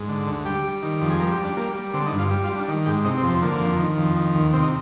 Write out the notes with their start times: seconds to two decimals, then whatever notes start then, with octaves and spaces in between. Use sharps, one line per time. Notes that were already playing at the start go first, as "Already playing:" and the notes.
Already playing: G#2
0.08 D3
0.27 D2
0.45 G3 G4
0.64 G3
0.83 D#3
1.01 F2
1.10 G#4
1.19 G3 A#4
1.32 G4
1.38 G3
1.44 D4
1.57 G3 A#3
1.75 G3
1.94 D3 C4
2.06 D#4
2.12 G2
2.18 F4
2.31 G3
2.44 F4
2.49 G3
2.55 D4
2.68 D#3
2.86 G#2 G4
3.05 C3 D#4
3.18 C4
3.23 F2
3.30 C4
3.42 D3 A#3
3.61 F2
3.79 D#3
3.98 F2
4.16 D#3
4.35 D#2
4.53 C3 C4
4.63 D#4